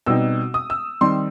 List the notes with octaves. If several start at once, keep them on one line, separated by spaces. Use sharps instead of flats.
B2 G3 C4 D#4 E6
D#6
E6
D#3 G3 C4 D#4 C6